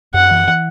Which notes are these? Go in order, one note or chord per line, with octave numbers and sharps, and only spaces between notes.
F#2 F#5
E3
E3